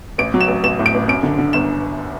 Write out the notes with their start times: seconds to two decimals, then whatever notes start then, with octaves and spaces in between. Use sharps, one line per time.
0.18 A1 D7
0.34 F#3
0.41 E7
0.48 A1
0.64 A1 E7
0.79 A2
0.86 D7
0.94 A1
1.08 F#2 D7
1.23 D3
1.38 D3
1.53 G1 E7